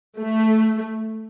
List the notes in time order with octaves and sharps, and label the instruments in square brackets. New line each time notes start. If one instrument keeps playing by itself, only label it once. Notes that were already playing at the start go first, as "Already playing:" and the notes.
[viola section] A3